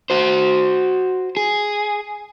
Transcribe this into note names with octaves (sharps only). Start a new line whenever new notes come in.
F#4 C5
G#4